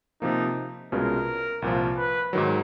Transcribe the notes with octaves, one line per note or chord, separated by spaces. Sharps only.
C3 F3 A#3 D#4
C2 B2 G#3 C#4 F4 A#4
C2 A#2 F3
B4
G#2 D#3 F#3